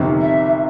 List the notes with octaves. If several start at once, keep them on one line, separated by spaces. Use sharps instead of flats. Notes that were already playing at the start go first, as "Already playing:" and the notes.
Already playing: G1 F2 C3 D#3
E5